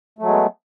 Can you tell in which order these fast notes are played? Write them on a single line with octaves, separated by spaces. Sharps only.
A3 F#3 G#3 B3